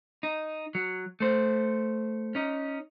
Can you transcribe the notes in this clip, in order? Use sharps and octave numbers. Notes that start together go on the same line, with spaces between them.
D#4
F#3
A3 C5
C#4 D#4